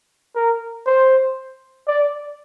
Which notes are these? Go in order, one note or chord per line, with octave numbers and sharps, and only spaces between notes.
A#4
C5
D5